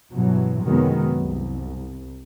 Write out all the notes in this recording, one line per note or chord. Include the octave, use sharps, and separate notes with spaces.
G2 B2 E3 F#3
F#1 C3 D#3 F#3 G#3 B3
C2